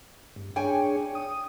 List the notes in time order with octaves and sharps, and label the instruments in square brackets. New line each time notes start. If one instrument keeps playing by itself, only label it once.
[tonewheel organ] G2
[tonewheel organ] D4 G#4 C#5 [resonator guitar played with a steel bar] G5 G#5
[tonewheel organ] D#6